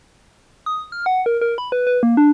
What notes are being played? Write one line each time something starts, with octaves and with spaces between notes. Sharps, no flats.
D#6
F6
F#5
A#4
A#4
B5
B4
B4
A#3
D4